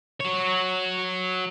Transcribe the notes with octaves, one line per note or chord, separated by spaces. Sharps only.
F#4 C#5